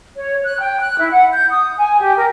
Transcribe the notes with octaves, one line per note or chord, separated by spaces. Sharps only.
C#5
F#6
G5
F#6
E4
F#5
G6
D#6
G#5
G4
A#4